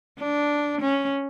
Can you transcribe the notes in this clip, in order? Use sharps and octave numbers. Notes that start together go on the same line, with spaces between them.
D4
C#4